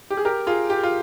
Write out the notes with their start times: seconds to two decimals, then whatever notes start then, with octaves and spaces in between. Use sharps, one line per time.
0.10 G4
0.17 G#4
0.25 G4 A#4
0.47 F4 G#4
0.70 G4
0.83 F4